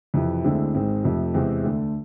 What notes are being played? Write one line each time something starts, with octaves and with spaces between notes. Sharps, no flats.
F2 C3 E3
D2 D3 G#3 C4 E4
G#1 G#2 G#3 C4
F2 C3 F3 A3
E2 C3 G#3 C4
D2 D3 A3